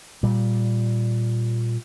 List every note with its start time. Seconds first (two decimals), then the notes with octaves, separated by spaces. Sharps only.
0.23 A#2 G3